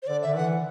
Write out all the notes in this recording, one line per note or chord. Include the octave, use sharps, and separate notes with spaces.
C5
D3 D5
D3 E5
E3 F#5